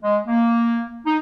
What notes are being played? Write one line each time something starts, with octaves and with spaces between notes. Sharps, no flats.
G#3
A#3
D#4